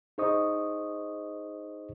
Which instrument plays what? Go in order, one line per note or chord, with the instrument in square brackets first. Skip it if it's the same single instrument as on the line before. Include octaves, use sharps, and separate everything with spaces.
[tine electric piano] D#4 G#4 C5 D#5 C#6 D#6